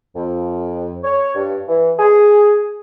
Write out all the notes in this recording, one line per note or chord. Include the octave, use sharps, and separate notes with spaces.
F2
C#5
G2
E3
G#4